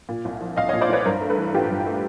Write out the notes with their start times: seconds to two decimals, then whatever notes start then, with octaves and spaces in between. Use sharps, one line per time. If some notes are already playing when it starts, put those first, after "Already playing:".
0.09 A#2
0.25 C2
0.41 F3
0.56 C2 D#5 F5
0.69 C#5 D#5
0.73 A#2
0.81 C5 D5
0.89 C2 B4 C#5
1.06 G2 A#4 C5
1.21 A3
1.30 A4 B4
1.37 E3
1.54 A1 F4 G4
1.71 G2
1.87 A3